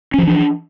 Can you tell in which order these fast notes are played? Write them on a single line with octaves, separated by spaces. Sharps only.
C#4 F3 E3 D4